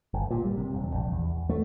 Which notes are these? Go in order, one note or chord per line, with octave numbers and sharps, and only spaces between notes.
G1
A#2
G3
C3
E1
A#1
E2
A3